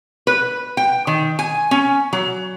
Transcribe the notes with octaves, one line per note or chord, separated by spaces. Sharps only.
B4
G5
D#3
G#5
C#4
F#3